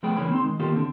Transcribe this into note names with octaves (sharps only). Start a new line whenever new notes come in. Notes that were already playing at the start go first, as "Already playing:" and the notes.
F3 A3 B3 G#4 G5 B5
C#2 E3 A#3 C#4 G#4 B5
C4 D#4 C6
D#3 G#3
D#3 A#3 F4 G4 A4
D3 C4